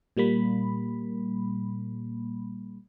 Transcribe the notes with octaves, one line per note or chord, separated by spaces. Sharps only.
A#2 G3 A#3 B5